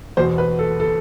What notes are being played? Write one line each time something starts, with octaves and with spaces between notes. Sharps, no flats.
E2 B2 C5
B4
A4
A4